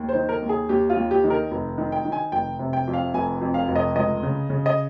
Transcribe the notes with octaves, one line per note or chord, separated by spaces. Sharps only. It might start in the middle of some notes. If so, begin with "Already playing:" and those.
Already playing: D#2
C5
D#3
A#4
D#2
G#4
D#2 G4
F4
D#2
G4
D#3
A#4
F1
D#3
G5
D#3
G#5
F1 G5
C3
G5
F2
F5
F1 G#5
F2
F5
F1
D#5
C#2 D#5
C#3
C#3
D#5